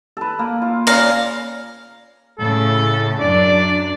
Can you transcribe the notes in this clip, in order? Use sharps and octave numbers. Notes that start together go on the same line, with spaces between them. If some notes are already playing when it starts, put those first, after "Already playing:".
A4 B4
A#3
F4
C#3 D5 F5 A#5
A2 C#3 A4
F#2 D4 D5